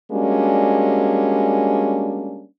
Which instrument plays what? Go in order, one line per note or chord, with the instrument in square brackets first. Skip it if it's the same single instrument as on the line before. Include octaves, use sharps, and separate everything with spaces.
[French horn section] G3 G#3 A#3 C#4 D4 F#4